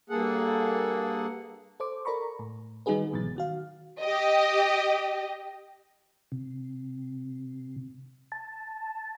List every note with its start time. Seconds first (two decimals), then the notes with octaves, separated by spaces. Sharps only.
0.10 G2 A#3 G#4 A4 F#5
1.80 A4 C5 D6
2.05 A4 A#4 D5 A#5 B5 C#6
2.39 A2
2.86 D#3 G3 D#4 F#4 G#4 B4
3.11 G1 G#2 B2 E3 F#3 A6
3.36 D#3 F#4 F5
4.01 G4 D#5
6.32 C3
8.32 A5